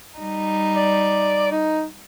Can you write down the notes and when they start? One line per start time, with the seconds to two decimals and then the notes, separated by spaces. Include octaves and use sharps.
0.19 G3 D#4
0.76 D5
1.51 D#4